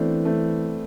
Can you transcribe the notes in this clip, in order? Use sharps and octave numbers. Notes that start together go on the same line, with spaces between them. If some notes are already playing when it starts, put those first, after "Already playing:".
Already playing: E3 A3 B3 C4 D4
A3 C4